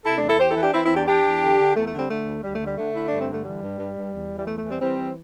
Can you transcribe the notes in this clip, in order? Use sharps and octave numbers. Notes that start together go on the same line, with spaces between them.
C3 E4 A4
A3 D4
E2
E4 A4
E2 G4 C5
E4 A4
E3
D4 G4
E3 C4 E4
C4 E4
E2
D4 G4
E2 D4 G4
E2
D3
D3
E2 A3
A3
D3
G3 C4
D3 A3
D2
D2 G3
A3
D3
G3
D3 A3
D3 E4
G2 D4
C4
D3 A3
E3 G3
G2
G2
G2
E2
E3
G3
E2 A3
A3
E3
G3 C4
E3 G3 C4
E3